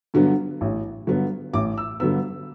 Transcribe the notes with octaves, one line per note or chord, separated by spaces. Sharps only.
G2 D3 F#3 B3
A1
G2 D3 F#3 B3
A1 D6
E6
G2 D3 F#3 B3 E6